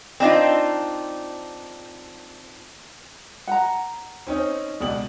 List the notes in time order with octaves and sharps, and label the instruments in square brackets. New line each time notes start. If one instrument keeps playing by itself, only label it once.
[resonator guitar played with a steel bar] C4 D4 D#4 F4
[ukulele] F#5 A#5
[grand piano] C4 C#4 D#4
[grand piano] C#2 B2 F#7 [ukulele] D5